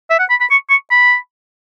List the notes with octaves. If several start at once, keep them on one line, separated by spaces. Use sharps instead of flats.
E5
F#5
B5
B5
C#6
C#6
B5